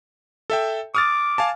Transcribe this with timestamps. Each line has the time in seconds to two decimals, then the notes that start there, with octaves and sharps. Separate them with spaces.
0.50 A4 E5 G5
0.95 D6 D#6 F6 A6
1.38 F5 G#5 A5